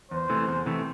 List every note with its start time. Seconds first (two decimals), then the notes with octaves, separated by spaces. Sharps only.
0.11 E2 C5
0.29 C3 E3 A3
0.48 E2
0.66 C3 E3 A3